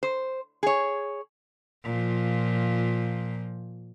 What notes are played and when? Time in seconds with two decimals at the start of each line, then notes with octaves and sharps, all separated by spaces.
0.03 C5
0.63 G#4 C#5
1.84 A#2 F3